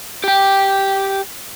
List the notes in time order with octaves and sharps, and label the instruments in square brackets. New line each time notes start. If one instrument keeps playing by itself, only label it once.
[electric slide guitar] G4 G5